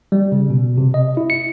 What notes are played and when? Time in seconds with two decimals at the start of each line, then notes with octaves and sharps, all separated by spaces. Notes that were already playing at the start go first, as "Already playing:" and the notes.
0.12 G3
0.32 C#3
0.50 B2
0.78 C3
0.94 D#5
1.17 E4
1.30 C#7